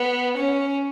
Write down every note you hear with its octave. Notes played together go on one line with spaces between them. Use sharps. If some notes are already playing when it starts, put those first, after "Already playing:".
Already playing: B3
C#4